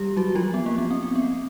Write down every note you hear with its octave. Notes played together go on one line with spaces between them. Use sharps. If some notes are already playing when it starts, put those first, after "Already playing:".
Already playing: G3 G4
F#3 F#4
F3 F4
B3
A#3
B3
C4
C4
B3